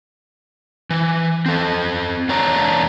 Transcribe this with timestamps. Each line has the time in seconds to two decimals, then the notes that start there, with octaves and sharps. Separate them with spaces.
0.90 E3
1.46 C4 A4
2.29 E2 A#3 D4 C#5 A#5